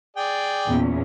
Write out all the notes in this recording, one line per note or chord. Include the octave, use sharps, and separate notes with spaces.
G#4 D5 G5
E2 A#2 C#4